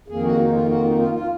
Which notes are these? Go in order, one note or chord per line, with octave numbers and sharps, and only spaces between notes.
F2 D#3 A#3 G#4
F#4
D#4
F4
F#4
D#4
F4
F4